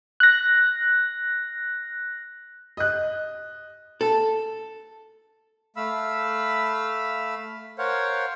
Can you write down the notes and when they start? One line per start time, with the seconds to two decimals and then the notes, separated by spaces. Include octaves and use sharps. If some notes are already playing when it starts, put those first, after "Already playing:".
0.20 F#6 A#6
2.77 D#5 F#6
4.01 A4
5.76 A3 F5 B5 E6
7.78 A#4 C5 C#5 F5 F#5